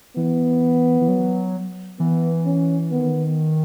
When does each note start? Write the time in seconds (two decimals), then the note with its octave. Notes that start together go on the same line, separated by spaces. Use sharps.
0.17 E3 B3
1.01 E3
1.08 F#3
2.00 E3 B3
2.46 C#4
2.92 D#3 B3